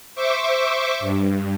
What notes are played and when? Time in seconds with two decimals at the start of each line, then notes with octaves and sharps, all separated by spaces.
0.15 C5 E5 C#6 D6
1.00 G2